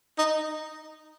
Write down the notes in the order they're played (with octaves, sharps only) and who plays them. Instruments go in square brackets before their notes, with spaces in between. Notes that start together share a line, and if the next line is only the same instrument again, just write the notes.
[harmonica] D#4